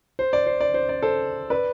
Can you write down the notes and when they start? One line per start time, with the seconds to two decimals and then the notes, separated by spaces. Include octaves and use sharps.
0.19 C5
0.33 D5
0.46 C5
0.61 D5
0.74 C5
0.89 D5
1.02 A4 C5
1.50 B4 D5